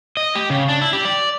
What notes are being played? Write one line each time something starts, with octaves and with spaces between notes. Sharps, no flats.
D#5
G4
C#3
D4
E4
G4
D5